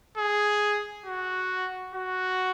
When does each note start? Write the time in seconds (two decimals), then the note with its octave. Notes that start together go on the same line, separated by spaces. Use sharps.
0.18 G#4
1.06 F#4
1.95 F#4